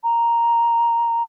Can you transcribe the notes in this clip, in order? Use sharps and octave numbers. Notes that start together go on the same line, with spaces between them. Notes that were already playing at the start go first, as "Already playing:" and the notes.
A#5